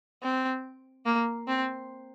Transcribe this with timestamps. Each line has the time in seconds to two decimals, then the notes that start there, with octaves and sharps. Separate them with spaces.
0.23 C4
1.06 A#3
1.48 C4